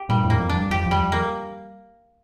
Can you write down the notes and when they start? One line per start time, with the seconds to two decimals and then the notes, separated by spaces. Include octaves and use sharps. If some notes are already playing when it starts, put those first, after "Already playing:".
Already playing: G4
0.09 G2 A#2 G3
0.24 F2 A2
0.30 A#3
0.39 F2
0.49 D4
0.56 G2
0.70 F2 G4
0.86 F2 G3
1.02 F2
1.12 A#3